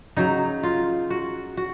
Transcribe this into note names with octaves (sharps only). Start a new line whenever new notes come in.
C#3 F#3 D#4
F4
F#4
F#4